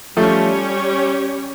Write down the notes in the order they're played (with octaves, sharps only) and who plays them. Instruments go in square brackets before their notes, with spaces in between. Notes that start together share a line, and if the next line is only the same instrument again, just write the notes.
[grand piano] F3 A3 [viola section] G3 C#4 G4 C#5